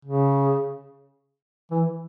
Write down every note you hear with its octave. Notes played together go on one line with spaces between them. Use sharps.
C#3
E3